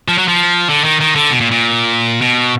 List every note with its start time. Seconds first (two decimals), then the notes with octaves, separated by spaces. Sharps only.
0.08 F3
0.18 F#3
0.28 F3
0.69 D3
0.84 D#3
1.01 D#3
1.15 D3
1.31 B2
1.40 A#2
1.51 A#2
2.21 B2